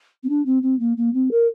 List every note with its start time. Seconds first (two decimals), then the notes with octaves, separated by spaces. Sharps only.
0.23 C4
0.29 D4
0.46 C4
0.62 C4
0.79 A#3
0.97 A#3
1.14 C4
1.31 A#4